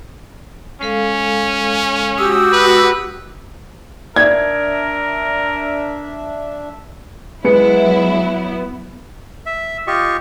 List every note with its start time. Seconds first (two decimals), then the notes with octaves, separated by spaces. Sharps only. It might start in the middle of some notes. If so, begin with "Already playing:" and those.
0.82 G#3 C#4 A4 F5
2.18 G#3 F#4 G4 D#6 E6
2.53 B4
4.16 D4 A#4 D5 E5 G#6
7.44 F#3 G#3 B3 E4 B4 C#7
9.46 E5
9.87 F4 G4 D#5 C#6